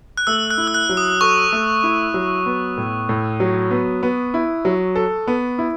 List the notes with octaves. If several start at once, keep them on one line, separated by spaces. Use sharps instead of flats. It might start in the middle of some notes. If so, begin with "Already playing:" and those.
F#6
A3 E6
F#6
E4
E6
F#6
F#3
D#6
A4 C#6
A3
E4
F#3
B3
A2
A2
F#3
B3
B3
E4
F#3
A4
B3
E4